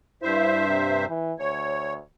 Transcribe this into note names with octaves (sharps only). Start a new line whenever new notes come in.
G2 E4 C5 E5
C3
E3
D2 C#5